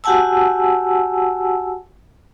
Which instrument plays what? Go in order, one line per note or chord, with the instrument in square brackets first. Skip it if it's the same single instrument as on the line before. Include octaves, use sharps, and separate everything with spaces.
[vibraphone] F#4 G4 F#5 G#5 A5 E6